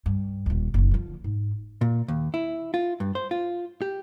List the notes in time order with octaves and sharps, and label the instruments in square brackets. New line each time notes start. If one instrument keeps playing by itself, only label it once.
[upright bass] G2
D#1 D#2
F#1 D#3
D3 F3
G#2
[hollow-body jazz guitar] A#2
D#2
E4
F4
G2
C5
F4
G4